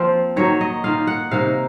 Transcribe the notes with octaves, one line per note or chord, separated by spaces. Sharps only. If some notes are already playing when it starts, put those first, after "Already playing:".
Already playing: F3 A#3 C4 F4
D#3 F#3 A#3 C#5
D#5
D#3 A#3 F4 F5
F#5
C3 D#3 A#3 D#4 F5